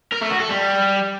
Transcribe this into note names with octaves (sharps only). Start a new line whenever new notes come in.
A#4
A3
F#4
A4
G3